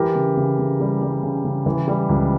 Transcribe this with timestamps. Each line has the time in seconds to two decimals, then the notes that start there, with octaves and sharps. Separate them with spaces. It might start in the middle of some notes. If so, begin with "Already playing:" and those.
Already playing: E3 G4 A#4
0.15 C#3
0.37 C#3
0.59 C#3
0.80 G3
1.02 G3
1.23 C#3
1.44 C#3
1.66 E3
1.88 G3
2.09 C#2